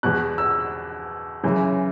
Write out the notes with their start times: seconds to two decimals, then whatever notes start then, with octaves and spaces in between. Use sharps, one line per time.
0.03 E2 B2 F#6
0.38 E6
1.43 F#2 C#3 E3